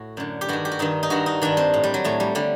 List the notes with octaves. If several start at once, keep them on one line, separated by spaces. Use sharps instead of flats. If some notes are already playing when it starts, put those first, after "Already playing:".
Already playing: A2 F#4
F#2 D3
G4
G2 D#3 F#4
G4
F#4
G2 D#3 D#4
D#4
G2 D#3 F#4
D#4
G2 D#3 D4
C4
A2
G3
F#3
A2 A3
G3
D3 G3